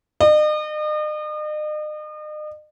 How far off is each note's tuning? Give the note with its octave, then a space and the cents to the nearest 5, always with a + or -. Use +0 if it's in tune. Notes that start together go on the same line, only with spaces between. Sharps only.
D#5 -40